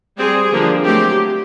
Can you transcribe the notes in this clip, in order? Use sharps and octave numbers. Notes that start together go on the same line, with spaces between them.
G3 C4 G#4
D3 F3 A#3 D4
F#3 A3 C4 G4